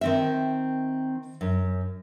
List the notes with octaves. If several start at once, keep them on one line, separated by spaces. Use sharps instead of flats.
D#3 C4 E5
F#2